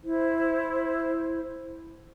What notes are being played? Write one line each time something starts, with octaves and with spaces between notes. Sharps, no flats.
E4 C5